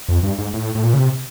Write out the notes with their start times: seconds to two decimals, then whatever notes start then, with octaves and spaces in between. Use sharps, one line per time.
0.09 F2
0.23 G2
0.39 G#2
0.54 A2
0.75 A2
0.84 A#2
0.94 C#3
0.99 C3